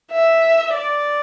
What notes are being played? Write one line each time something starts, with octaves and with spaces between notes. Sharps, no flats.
E5
D5